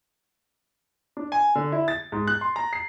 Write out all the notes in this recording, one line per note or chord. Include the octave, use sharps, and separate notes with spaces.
D4
G#5
D3
E4
A6
G#2
F#6
C6
A#5
C7